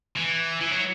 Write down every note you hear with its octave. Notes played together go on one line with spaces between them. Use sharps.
E3
E3
F#3